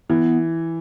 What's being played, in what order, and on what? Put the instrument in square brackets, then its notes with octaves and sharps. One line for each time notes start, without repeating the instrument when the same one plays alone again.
[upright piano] E3 [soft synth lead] B3